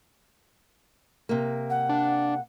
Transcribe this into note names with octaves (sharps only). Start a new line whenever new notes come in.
C3 A#3
F#5
D4